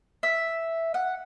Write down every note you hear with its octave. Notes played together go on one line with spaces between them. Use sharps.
E5
F#5